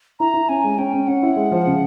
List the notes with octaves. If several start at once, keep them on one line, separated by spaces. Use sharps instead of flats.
E4 A#5
E4
C#4 G#5
G#3
C#4 G5
C#4
C#4 F#5
E4
G#3
F3
C#3